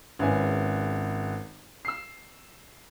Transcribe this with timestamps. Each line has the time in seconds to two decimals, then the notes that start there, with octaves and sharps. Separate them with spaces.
0.19 G#1 C#4 E4 B4 G#5
1.85 E6 C7